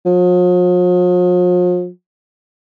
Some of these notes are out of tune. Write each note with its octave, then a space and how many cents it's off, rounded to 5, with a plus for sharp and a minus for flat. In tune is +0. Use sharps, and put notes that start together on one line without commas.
F3 +45